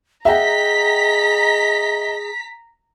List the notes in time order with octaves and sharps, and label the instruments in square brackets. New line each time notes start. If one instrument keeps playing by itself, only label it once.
[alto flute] G#4 [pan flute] D#5 [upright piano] E5 F#5 G5 [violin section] A#5 B6